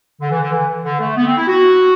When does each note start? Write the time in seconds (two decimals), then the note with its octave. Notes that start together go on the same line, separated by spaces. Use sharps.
0.21 D3
0.30 E3
0.41 D3
0.51 E3
0.83 D3
0.99 A3
1.16 B3
1.26 C4
1.36 E4
1.47 F#4